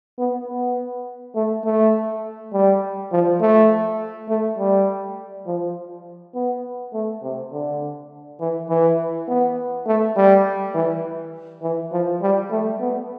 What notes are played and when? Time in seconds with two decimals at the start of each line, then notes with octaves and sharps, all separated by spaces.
0.18 B3
0.48 B3
1.35 A3
1.65 A3
2.53 G3
3.12 F3
3.41 A3
4.29 A3
4.59 G3
5.47 F3
6.35 B3
6.93 A3
7.23 C3
7.52 D3
8.40 E3
8.69 E3
9.28 B3
9.87 A3
10.16 G3
10.75 E3
11.62 E3
11.92 F3
12.22 G3
12.51 A3
12.80 B3